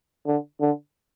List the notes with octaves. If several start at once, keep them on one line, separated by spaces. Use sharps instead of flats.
D3
D3